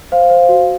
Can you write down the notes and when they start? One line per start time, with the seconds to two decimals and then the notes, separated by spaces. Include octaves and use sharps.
0.12 C5 F5
0.30 C5
0.49 F#4